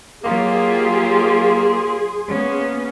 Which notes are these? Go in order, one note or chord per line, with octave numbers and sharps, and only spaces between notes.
F#3 A#3 F4 G4 G#4 C6
A#3 B3 C#4